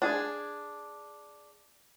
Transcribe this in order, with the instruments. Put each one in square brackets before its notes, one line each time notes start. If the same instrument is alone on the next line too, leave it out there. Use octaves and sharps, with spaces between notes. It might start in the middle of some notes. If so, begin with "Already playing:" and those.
[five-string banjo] D4 G#4